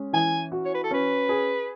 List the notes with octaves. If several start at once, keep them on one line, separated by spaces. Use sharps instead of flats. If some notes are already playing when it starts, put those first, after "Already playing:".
Already playing: G#3 C#4
E3 G#5
F#4
C#5
B4
A4
C#4 B4
G#4